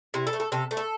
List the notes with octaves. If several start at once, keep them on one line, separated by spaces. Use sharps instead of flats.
C3 E4
A4
A3
A4
C3 A4
A3
A4